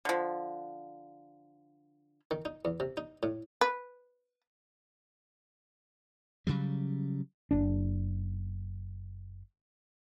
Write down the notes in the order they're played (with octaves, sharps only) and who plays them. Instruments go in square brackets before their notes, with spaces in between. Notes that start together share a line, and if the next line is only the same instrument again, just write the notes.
[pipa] D3 F3
[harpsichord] D#3
D#4
E2
C3
D#4
A2
[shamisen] B4
[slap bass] C#3 F#3 G3
[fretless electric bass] F#1 D4